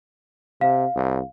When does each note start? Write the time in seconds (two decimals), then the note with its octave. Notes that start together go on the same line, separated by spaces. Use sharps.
0.61 C3 F5
0.95 C2